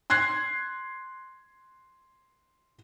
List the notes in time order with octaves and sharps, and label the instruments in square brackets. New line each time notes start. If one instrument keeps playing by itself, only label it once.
[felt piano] C6 F#6 G#6 C7